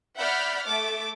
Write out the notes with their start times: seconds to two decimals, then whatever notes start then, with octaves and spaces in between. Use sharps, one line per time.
0.18 D5 E5 F#5 B5 F6 G6
0.67 A3 E5 D6 A6